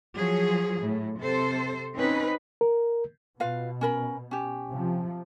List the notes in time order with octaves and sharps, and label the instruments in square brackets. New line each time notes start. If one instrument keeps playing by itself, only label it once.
[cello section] F3 F#3 G#4
A2
C3 A4 C5
C4 C#4 D#4 B4
[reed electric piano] A#4
[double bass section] B2 [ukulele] F4 B4 F5
[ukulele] C#4 A#4 B5
C#4 G4
[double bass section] C3 F3